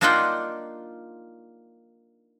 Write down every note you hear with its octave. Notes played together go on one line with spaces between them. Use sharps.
A#3 D4 D#4 F4 F#5 G5